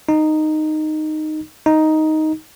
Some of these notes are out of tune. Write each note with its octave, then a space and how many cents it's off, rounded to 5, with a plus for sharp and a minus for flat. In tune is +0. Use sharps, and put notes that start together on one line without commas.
D#4 -10
D#4 +5